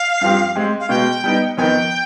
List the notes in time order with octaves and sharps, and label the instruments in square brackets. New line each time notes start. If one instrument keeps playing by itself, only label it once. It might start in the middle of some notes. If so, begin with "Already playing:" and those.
Already playing: [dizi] F5
[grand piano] G2 F3 C4 G4
G#3 C4 G4 C5
[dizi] F5
[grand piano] B2 G#3 B3 [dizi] G5
[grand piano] G3 B3 D#4
[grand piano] F2 D#3 B3 D#4 [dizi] G5 G#5